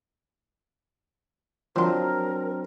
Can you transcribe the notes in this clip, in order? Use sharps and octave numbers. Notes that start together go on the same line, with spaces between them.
F3 F#3 C4 D4 F4 A#4